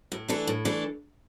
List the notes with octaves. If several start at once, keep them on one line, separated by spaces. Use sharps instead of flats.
A2
E3 A3 D4 A4
A2
E3 A3 D4 A4